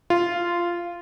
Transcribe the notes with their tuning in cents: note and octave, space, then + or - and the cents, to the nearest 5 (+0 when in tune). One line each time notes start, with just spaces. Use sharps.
F4 -10